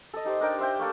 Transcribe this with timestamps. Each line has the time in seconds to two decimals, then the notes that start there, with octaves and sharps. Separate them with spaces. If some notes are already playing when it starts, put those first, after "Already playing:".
0.14 A4 D#5
0.25 D#4 G4 C5
0.41 D4 D#4 A#4 G5
0.59 C5 E5 G5
0.79 A3 A#3 A4